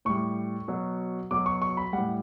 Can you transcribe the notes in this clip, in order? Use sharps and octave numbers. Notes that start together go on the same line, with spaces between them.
A2 G3 C#6
B2 F#3
B2 F#3 D6
C#6
C#6
B5
G3 F#5
A2